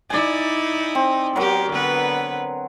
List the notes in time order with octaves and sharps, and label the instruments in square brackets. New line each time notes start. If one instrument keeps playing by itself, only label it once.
[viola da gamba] D#4 E4 [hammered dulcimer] D5 G#5
[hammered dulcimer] C4
[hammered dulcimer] F#3 A#4 [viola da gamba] B3 G4
[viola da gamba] D3 B3 B4